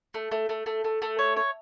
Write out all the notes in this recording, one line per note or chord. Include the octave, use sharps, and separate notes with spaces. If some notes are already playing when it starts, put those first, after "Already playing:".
A3
A3
A3
A3
A3
A3
C#5
C#5